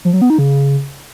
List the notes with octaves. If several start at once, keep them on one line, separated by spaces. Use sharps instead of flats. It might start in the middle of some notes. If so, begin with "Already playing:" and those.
F3
F#3
B3
D#4
C#3